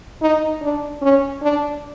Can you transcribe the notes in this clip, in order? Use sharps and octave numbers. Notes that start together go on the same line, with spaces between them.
D#4
D4
C#4
D4